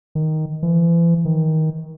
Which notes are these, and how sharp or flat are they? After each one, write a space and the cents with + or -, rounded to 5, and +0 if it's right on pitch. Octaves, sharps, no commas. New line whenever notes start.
D#3 +5
E3 +40
D#3 +20